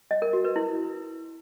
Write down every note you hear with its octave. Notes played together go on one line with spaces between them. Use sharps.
D#5
A#4
F#4
B4
E4